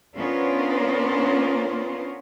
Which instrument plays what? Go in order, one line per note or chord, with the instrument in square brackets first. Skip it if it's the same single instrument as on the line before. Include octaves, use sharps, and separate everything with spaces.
[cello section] B3 C#4 D4 F4 A#4 C5